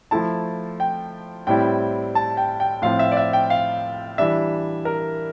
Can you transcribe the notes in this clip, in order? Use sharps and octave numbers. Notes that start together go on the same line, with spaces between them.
F3 A3 E4 A5
G5
A2 G3 C4 E4 G5
A5
G5
G5
A2 F3 C4 F4 F5
E5
D5
E5
G5
F5
E3 G3 D4 E5
A#4